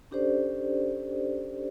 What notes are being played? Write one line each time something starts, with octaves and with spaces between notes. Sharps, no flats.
C#4 D4 G4 A4 C5 D5